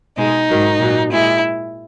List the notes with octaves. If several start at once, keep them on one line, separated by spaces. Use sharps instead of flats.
B2 G#3 D#4
G#2 D#3 F#3
A#2 F#3
A#2 G#3 E4